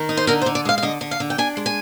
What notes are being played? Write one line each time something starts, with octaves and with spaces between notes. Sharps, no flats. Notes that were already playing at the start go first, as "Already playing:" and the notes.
Already playing: D#3
D#4
C5
D3 A#4
C5
D3
D5
G#3 F5
F5
D3 D#5
D3
F5
D3
G5
D4 G#5
G#3
G#5